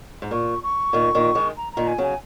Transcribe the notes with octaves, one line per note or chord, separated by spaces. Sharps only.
G#2
A#2 C#6
C#6
A#2 D#3
A#2 D#3
D#3 G#3
A#5
A#2 D#3 A#5
G#5
C#3 F#3 G#5